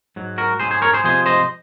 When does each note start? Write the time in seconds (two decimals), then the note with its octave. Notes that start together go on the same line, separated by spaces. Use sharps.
0.16 G#2 F#3
0.38 F#4 A#4
0.60 G#2 F#3 G#4 C5
0.71 G#4 C5
0.82 A#4 C#5
0.93 G#4 C5
1.04 C3 F3 G#3 G#4 C5
1.26 C5 D#5